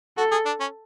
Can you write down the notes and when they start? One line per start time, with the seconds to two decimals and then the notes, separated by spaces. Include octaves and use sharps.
0.17 F#4 A4
0.31 G#4
0.46 D4
0.60 C#4